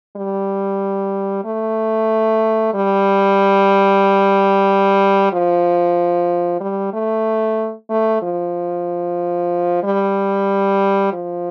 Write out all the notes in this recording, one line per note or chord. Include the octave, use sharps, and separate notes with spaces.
G3
A3
G3
F3
G3
A3
A3
F3
G3
F3